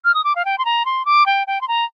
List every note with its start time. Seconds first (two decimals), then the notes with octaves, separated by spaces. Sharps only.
0.05 F6
0.14 D#6
0.24 D6
0.35 F5
0.45 G5
0.58 C6
0.65 A#5
0.85 C6
1.05 D6
1.26 G5
1.47 G5
1.61 C6
1.68 A#5